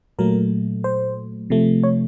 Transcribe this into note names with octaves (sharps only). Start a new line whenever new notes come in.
A#2 F#3 A3 A#4
C5
C3 F3 A3
C#5